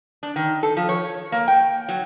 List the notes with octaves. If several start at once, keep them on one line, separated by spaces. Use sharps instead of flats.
D4
D#3
A4
F3
C#5
A#3
G5
F#3